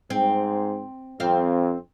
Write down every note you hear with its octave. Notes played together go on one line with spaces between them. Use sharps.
G#2 C4
F2 C4 F5